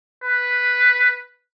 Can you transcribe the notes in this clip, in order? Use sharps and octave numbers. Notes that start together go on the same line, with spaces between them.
B4